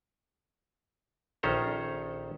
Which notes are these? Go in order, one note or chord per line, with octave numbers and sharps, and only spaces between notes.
A#1 D#3 C#4 A4 C5 A#5